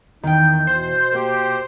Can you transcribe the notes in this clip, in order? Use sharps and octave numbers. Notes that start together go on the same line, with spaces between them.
E2 D#3 D#4 G5 G6
B2 C5
A#3 G4 A#4